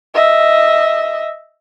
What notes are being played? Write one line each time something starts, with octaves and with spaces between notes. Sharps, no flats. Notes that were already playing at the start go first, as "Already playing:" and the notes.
D#5 E5